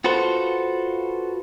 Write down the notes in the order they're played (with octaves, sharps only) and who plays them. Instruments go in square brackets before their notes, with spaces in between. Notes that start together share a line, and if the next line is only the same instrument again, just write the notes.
[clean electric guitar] F4 F#4 A4 B4 C5